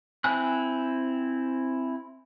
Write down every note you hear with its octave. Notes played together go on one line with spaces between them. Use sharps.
C4 E4 G#5 F#6